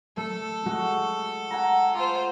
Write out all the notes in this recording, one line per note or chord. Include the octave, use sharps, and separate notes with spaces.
A3 A4
G#3 A3 F#4
F#5 G#5 A#5
F4 C5 D6